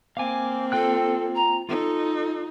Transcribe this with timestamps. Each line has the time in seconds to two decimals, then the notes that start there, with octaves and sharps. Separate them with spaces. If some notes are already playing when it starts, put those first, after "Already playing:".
0.17 A#3 C4 F5 G#5 D6
0.72 F4 A4 G5 F#6
1.35 A#5
1.69 D#4 F4 A4